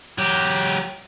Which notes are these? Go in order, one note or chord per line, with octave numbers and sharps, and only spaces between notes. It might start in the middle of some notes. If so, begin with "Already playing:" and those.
F#3 G4